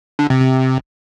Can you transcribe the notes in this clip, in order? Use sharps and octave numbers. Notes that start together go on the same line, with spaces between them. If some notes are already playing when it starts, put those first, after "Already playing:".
D3
C3
C3